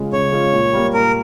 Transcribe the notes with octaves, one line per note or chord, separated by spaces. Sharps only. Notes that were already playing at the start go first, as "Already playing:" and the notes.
Already playing: C#3 G#3 C#4 F4
C#3 C#5
G#3 C#4 F4
A#2
G3 A#3
A#2 A#4